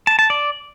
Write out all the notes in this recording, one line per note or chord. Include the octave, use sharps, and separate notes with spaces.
A5
A5
D5